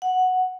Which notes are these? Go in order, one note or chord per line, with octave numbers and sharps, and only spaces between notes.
F#5